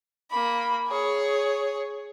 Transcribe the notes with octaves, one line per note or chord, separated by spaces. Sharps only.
A#3 B5
G#4 C#5